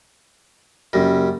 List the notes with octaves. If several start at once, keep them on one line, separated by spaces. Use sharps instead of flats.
F#2 C#3 G3 A#3 A#6